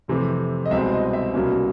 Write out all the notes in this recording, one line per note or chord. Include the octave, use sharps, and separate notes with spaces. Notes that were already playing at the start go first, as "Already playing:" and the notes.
F2 C3 E3 A3 C4
D#5
C2 B2 G#3 C4 E5
D#5
E5
C2 B2 F#3 A#3 C#4